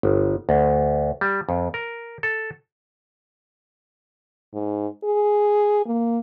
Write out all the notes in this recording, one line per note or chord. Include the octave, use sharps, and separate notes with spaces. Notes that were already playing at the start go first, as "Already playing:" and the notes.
G1
D2
G3
F2
A#4
A4
G#2
G#4
A#3